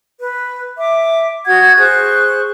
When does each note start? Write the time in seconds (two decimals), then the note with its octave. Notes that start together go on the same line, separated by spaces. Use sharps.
0.19 B4
0.77 E5 D6
1.46 F#4 F#5 D#6 G#6
1.78 G#4 C5 C#6 F#6